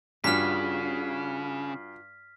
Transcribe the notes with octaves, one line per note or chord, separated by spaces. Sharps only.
G2 C#3 F4 F#4 G#4 F6 B6